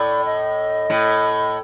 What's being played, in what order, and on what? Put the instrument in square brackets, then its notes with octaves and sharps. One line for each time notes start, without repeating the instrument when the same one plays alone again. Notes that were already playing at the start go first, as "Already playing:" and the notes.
Already playing: [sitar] A2 [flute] D5
[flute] D#5
[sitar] A2